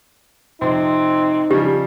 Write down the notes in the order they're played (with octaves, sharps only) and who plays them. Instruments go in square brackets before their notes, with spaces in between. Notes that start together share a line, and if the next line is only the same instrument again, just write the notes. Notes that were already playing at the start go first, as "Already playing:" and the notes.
[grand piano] F2 C3 C6 [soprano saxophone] C4 [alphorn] D#4
[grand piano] C#3 F3 G3 [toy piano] G4